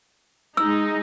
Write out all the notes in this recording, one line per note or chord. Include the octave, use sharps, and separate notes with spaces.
G#3 D#4 E6